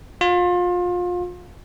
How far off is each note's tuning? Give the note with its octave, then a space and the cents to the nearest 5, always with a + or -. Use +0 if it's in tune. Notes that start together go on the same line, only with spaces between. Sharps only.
F4 +30